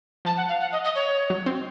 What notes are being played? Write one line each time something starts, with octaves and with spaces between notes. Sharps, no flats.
F3 A5
F#5
F5
F#5
D#5
D#5
C#5
F#3
C4